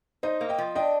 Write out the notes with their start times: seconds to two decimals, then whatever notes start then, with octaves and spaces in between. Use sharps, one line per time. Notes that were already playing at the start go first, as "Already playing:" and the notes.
0.23 D#4 C5 D#5
0.41 A#3
0.49 D#5 G5
0.58 F3
0.75 D4 D#5 G5